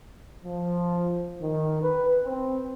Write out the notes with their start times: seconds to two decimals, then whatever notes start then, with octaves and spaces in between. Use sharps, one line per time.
0.44 F3
1.41 D#3
1.82 B4
2.23 C4